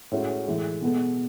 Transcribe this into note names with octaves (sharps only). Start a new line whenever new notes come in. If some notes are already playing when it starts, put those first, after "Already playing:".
A2 G#3 C#4 F#4
A2 E3 G#3
B2 G#3 B3 F#4 A4